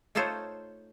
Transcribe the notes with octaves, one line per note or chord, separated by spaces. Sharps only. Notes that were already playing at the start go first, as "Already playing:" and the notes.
A3 D#4 F4 A4 C5 C#5